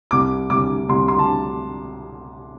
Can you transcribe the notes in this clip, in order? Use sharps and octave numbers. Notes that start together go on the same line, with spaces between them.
C2 D6
C2 D6
C2 C6
C6
A5